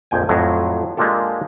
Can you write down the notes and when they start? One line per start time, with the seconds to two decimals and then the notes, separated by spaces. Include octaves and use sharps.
0.11 A#1 F2 G5 G#5
0.29 F2 A2 F#3
0.97 G#3 A#3 D4 F4 G4 A4